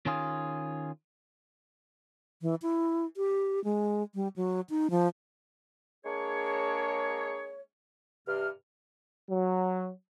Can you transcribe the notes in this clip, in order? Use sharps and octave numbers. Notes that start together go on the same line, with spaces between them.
D#3 C#4 F4 G#4
E3
E4
G4
G#3
G3
F#3
D#4
F3
G#3 A#3 D4 G#4 C#5
G2 C3 F6
F#3